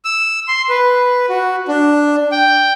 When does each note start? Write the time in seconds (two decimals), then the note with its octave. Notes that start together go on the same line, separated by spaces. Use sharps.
0.05 E6
0.48 C6
0.69 B4
1.29 F#4
1.68 D4
2.32 G5